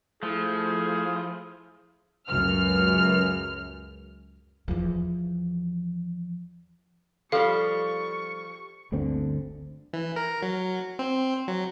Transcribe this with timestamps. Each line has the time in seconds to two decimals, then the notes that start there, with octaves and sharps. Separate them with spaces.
0.23 F3 A3 E4 G#4
2.28 C#2 F#2 F6
4.68 E2 F3
7.32 F3 G3 A4 F5 C#6
8.92 G1 D2 D3 C4
9.93 E3
10.16 A#4
10.43 F#3
10.99 C4
11.48 F#3